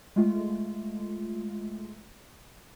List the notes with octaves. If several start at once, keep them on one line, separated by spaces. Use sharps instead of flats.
G#3 A3 F4